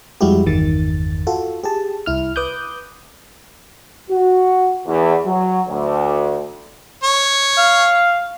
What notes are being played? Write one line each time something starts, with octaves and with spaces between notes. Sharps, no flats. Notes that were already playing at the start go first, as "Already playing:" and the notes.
F2 G3 G#3 E4 F#4 G4
G1 E2 D#3 A6
F4 F#4 A4
G4 G#4 A5
C2 E4 F6
B4 D6 D#6 F#6 G6
F#4
E2
F#3
D2
C#5
F5